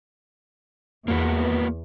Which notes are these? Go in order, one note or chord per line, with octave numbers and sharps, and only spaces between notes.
E2 A#3 F#4 B4